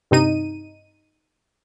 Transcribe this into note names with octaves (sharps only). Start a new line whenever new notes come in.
G2 C3 D#4 D#7